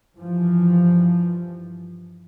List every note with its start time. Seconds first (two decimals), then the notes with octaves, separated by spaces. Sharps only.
0.17 G2 E3 F3